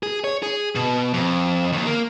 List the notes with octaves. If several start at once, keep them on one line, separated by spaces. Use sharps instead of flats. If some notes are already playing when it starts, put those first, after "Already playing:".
G#4
C#5
G#4
B2
F2
D#2
A#3